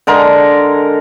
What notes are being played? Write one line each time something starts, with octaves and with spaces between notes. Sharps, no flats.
D3 G#3 A#4